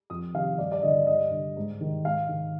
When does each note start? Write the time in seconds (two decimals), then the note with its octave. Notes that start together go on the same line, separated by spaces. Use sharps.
0.10 F2 D#6
0.34 C3 D#3 F5
0.58 G2 D5
0.72 D5
0.83 D3 D#5
1.07 G2 D#5
1.31 D3
1.57 G#2
1.81 D#3
2.05 G#2 F5
2.29 D#3